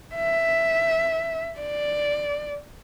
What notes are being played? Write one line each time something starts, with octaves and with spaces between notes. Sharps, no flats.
E5
D5